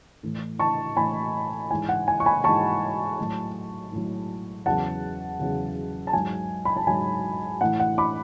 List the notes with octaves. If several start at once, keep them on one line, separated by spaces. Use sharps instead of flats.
A2 E3
A5 C#6
A2 E3 G#5 B5
G#2 E3 G#5
F#5
G#5
C#6
G#5 B5
G#2 E3 A5 C#6
A2 F#3
A2 F#3
E2 C#3 F#3 F#5 A5
E2 C#3 F#3
A5
G#2 F#3 G#5
B5
A5
G#2 F#3 G#5
A2 E3 F#5
F#5
B5 D6